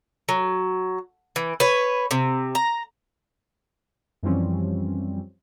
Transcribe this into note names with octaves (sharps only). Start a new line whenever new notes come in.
F#3
E3
B4 C#5
C3
A#5
F#2 E3 F3 G3 C4 C#4